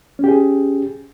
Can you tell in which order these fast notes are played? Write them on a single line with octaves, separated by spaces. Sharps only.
C#4 G4 G#4